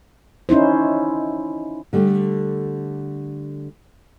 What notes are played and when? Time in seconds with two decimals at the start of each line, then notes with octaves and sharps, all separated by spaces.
0.49 C#4 D#4 E4 C5
1.93 D3 G3 A3